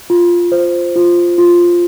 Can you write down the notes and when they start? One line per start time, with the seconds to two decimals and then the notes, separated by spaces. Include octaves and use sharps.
0.10 F4
0.52 C5
0.95 F4
1.38 F4